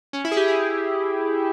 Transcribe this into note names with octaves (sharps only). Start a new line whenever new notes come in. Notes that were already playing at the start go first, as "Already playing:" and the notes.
C#4
E4
G#4
G4
G#4